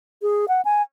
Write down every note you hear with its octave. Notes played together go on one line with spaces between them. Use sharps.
G#4
F#5
G#5